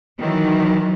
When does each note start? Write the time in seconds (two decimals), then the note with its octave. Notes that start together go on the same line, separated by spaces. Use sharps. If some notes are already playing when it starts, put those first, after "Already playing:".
0.18 D#3 E3 F#3